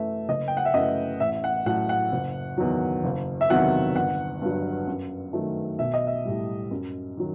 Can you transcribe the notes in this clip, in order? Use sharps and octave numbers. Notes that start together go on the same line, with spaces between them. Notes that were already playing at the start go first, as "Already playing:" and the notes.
Already playing: F#2 E3 A3 E5
F#1 D#5
G5
F#5
E5
F#2 E3 A3 D#5
A1 E5
F#5
A2 F#3 F#5
F#5
F#1
E2 D#3 F#3
F#1
E5
E2 C3 D#3 F#3 F#5
G1 F#5
G2 F#3
F#2
D#3 F#3 A3
B1 E5
D#5
E5
A2 G3
F#2
D#3 F#3